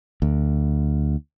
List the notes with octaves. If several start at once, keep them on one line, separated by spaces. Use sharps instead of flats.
D2